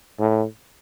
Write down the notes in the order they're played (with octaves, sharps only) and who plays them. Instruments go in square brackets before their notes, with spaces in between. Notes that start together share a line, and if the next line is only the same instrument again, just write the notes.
[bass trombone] A2